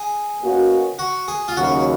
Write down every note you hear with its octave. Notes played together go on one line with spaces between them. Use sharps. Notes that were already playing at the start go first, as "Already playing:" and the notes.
Already playing: G#4
B2 A#3 C#4 F#4
F#4
G#4
F4
D#2 C#3 F#3 F#4